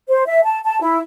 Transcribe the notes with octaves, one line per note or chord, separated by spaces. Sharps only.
C5
E5
A5
A5
E4